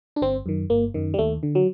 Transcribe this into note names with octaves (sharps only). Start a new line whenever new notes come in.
D4
G1 C4
F#2 D#3
G1 A#3
F#2 D#3
G3
D#2 A3
D3
F#3